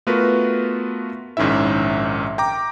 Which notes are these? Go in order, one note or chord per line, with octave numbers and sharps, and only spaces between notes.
A3 B3 F4 F#4 A#4 B4
A#1 G#2 D#3 C#4 E4 E5
G5 A#5 D6